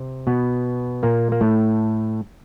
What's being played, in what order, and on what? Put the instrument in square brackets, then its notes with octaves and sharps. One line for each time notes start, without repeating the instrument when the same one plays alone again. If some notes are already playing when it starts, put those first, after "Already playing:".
Already playing: [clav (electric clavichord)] C3 C4
B2 B3
A#2 A#3
A#3
A2 A3